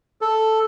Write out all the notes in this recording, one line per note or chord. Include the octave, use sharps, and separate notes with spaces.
A4